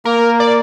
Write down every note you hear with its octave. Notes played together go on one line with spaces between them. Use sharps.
A#3 A#4
D5